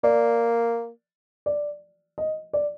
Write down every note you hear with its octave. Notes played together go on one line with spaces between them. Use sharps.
A#3 D5
D5
D#5
D5